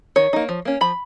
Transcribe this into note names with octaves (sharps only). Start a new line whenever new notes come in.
D#3 C#5
A#3 D#4
F3
A#3 C#4
F3 B5